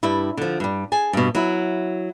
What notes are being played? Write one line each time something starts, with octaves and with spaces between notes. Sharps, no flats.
G2 G3 E4
D3 F3
G2 G3
G#4 G#5 A5
G2 B2
F#3 E4